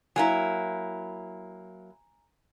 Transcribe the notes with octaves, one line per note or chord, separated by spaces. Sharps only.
F#3 A#3 E4 G#5 A#5